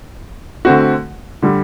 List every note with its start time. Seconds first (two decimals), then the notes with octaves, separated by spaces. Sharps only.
0.65 D3 A3 C4 F#4
1.42 D3 G3